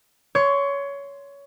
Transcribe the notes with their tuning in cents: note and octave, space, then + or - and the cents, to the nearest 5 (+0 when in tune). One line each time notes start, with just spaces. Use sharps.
C#5 +20 C6 +0